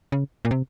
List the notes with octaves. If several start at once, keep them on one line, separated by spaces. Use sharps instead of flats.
C#3
A#2
C3